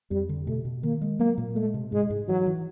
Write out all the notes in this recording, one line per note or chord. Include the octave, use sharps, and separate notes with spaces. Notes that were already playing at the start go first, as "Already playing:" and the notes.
F2 G3
D3
B2 A3
B2
D#3 A#3
G#3
F#3 A#3
A#2
G#3 A3
C3
G#2 G#3
G#2
E3 F#3
E3